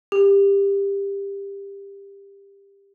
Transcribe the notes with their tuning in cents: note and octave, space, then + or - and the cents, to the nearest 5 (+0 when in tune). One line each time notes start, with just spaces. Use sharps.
G4 +20